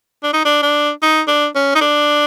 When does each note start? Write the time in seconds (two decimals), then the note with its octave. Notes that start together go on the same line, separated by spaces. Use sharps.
0.23 D4
0.34 D#4
0.45 D4
0.62 D4
1.03 D#4
1.28 D4
1.56 C#4
1.75 D#4
1.81 D4